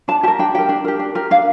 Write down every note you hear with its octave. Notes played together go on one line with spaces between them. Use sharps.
D4 A5
G4 A5
A#4
D4 G5
G4 A#4 G5
D4
G4 A#4
D4
G4 A#4
D4 F5